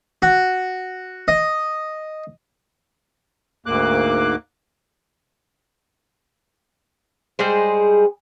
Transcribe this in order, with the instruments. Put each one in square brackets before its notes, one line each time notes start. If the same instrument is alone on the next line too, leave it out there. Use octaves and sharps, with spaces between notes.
[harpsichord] F#4
D#5
[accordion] D2 G#2 A#3 D6 F#6
[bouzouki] G3 G#3 G#4 C5